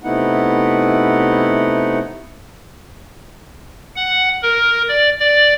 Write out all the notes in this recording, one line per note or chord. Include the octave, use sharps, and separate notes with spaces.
C3 A3 B3 D#4 E4 F#5
F#5
A#4
D5
D5